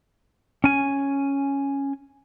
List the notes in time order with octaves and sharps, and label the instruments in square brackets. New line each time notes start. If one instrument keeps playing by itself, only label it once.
[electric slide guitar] C#4 G#5